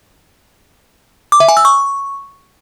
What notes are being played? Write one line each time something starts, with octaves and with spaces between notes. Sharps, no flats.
D6
E5
G#5
E6
C#6